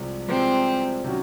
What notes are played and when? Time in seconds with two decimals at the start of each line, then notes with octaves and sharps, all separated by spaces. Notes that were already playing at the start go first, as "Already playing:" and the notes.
Already playing: C2 C3 F3 G#3
0.28 C2 C3 F3 G#3 C4
1.04 C3 D#3 F#3 C#4 F#4